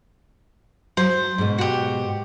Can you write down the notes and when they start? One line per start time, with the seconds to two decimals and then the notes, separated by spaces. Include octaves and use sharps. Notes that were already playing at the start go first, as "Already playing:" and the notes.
0.97 F#3 C5
1.38 G#2 B2
1.58 F#4 G4